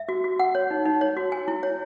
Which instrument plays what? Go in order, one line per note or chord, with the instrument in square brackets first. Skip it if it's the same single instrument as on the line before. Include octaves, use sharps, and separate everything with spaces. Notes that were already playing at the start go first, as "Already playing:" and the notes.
Already playing: [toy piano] E5
F#4
F#4
F#5
C#5
D#4
D#4
C#5
F#4
G#5
E4
C#5